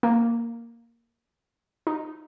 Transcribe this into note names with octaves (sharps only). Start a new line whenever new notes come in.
A#3
D#4